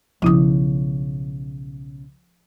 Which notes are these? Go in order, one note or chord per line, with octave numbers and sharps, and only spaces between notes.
B1 C#3 F3 E4 D#6